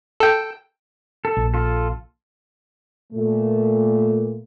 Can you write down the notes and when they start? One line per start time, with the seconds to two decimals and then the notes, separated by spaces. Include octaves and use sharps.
0.20 A4 G5
1.25 A4
1.37 A#1
1.54 F4 A4
3.13 A#2 A3